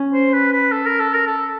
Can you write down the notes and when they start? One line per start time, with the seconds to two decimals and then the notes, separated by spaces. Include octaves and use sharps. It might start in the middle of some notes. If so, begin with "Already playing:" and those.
Already playing: C#4
0.13 C5
0.33 B4
0.52 B4
0.72 A4
0.85 A#4
1.00 A4
1.13 A#4
1.27 A4